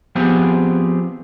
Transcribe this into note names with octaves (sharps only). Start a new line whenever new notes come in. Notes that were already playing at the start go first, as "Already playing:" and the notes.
F3 B3 C4 G4 G#4